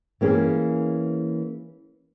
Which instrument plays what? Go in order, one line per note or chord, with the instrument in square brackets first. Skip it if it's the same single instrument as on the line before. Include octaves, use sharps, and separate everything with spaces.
[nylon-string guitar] E3 A#3 C#4 G#4